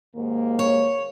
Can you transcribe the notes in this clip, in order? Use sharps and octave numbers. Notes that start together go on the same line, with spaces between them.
D#2 G#2 A#3
C#5